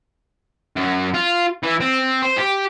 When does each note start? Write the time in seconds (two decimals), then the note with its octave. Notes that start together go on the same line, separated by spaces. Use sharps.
0.76 F#2
1.14 F4
1.63 E3
1.80 C4
2.23 C5
2.38 G4